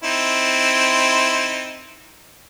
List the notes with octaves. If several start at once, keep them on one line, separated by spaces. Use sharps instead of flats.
C4 D#4 E4